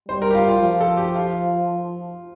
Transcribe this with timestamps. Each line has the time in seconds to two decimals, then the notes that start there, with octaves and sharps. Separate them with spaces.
0.08 G3 C5
0.22 A#4
0.30 G4
0.35 F4
0.49 F4
0.62 F3
0.81 A4
0.97 G4
1.16 F4